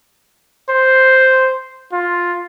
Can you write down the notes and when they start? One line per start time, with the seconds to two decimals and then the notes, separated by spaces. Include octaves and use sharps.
0.70 C5
1.93 F4